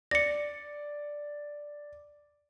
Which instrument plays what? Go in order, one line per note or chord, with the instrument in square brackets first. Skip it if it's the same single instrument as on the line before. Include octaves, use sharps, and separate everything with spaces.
[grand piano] D5 [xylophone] A#6 C#7